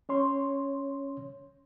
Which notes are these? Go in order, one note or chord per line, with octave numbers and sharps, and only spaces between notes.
C#4 C#5 C6